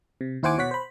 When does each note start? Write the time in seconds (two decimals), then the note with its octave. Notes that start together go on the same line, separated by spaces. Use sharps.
0.21 C3
0.43 D#2 E4 C5 F#5 G#5 D6
0.58 B2 C#5 F#5 B6
0.71 C5 B5